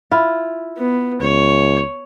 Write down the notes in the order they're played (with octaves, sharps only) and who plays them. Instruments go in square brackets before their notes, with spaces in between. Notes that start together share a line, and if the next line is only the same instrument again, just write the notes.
[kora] E4 F4
[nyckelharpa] B3
[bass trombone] C#2 [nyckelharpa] C#5